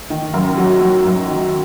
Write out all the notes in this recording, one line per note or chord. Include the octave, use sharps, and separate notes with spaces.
D#3
F#2
F#3
F#3
F#2
D#3